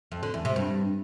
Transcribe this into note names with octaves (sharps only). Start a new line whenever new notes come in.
F2
D3
E2
C3
G2